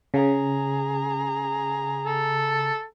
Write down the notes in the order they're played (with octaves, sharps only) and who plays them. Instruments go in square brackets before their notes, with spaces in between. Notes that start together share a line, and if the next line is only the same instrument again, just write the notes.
[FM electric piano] C#3 [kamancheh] G#4 A#5
[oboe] A4